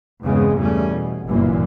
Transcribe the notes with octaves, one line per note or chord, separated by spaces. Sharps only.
E2 G2 C#3 G#3 B3 C4
E2 C#3 G3 A3 C#4
B2
G1 C2 F#2 A#2 E3 A#3